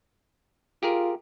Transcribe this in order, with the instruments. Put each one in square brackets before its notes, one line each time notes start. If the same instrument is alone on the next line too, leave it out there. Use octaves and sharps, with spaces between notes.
[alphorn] F4 [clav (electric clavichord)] G4 G#4 A#4